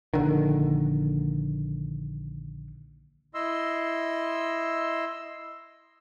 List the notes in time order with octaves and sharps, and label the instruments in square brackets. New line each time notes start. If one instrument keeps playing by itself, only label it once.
[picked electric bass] A#1 D3 D#3
[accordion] E4 D#5 C6 E6